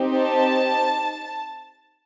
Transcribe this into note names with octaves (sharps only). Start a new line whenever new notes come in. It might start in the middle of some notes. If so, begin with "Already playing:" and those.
Already playing: C4 D#4 G4
A5